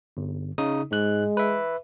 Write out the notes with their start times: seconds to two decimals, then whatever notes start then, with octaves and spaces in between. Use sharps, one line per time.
0.17 G1
0.58 C#3 D#4 D#6
0.91 G#2 G#3 F#6
1.37 B4 E5